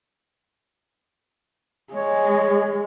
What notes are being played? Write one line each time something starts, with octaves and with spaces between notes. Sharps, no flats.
G#3 C#5